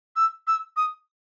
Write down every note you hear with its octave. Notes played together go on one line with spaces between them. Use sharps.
E6
E6
D#6